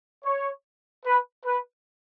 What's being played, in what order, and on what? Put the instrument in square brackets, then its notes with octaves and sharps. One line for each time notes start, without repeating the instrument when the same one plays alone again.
[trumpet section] C#5
B4
B4